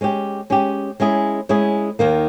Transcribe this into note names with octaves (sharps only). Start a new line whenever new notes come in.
G#3 C#4 G4
G#3 C#4 G4
G#3 C#4 E4 G#4
G#3 C#4 E4 G#4
D#2 D#3 A#3